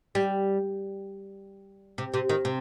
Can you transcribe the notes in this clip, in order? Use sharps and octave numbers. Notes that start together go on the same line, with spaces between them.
G3
C3
C3
D#3
C3